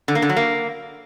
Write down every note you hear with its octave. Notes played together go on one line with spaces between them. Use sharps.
D3
A#3
D3
F#3
A#3